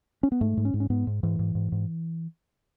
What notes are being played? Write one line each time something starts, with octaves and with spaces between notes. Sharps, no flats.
C#4
B3
G#2 A3
G#2
C#4
G#2
C#4
G#2 B3
G#2
G#2 E3
G#2
G#2
G#2